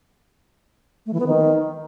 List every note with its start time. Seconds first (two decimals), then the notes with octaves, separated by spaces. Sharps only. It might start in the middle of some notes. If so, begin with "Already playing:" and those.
1.06 A3
1.13 E3
1.20 B3
1.27 D#3